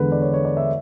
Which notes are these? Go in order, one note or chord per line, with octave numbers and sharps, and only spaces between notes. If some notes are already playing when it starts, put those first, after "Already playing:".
Already playing: E2 D3 G#3 B3 B4
D5
C#5
C#5
D5
E5